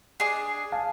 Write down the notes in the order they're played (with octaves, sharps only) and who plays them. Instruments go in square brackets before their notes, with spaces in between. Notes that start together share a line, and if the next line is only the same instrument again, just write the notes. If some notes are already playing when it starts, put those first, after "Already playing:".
[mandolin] D4 G#4
[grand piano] F5 G#5 A5